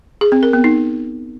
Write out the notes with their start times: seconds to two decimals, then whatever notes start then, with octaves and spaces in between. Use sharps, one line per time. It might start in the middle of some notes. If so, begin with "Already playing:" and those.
0.21 G#4
0.32 C4
0.43 A#4
0.53 B3
0.64 D#4